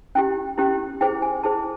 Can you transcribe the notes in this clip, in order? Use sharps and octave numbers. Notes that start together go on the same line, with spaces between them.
C#4 E4 G4 G5
C#4 E4 G4
E4 G#4 C5 G5
G#5
E4 G#4 C5 A5